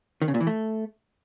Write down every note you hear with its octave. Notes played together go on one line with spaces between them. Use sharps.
D#3
C#3
A#2
E3
A3